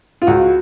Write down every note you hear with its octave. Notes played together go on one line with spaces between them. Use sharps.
F4
C#2 F#4